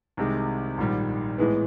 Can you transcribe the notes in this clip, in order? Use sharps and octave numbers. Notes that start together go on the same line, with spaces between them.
C2 C3 D#3 G#3
A#1 G#2 D#3 G3
A2 E3 G#3 B3